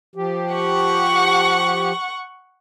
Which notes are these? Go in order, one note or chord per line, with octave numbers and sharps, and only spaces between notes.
F3 G4
F#5 C#6